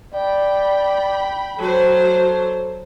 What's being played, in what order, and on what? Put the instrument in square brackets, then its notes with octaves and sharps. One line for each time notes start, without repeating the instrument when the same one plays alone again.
[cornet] D5 [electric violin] G5 B5
[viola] F#3 C5 [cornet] A4